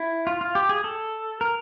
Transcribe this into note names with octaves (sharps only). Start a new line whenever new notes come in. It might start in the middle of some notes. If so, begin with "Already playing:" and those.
Already playing: E4
F4
F4
G4
G#4
A4
A#4